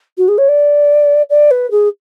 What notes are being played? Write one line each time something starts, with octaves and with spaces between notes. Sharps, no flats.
F#4
G#4
C#5
D5
D5
B4
G#4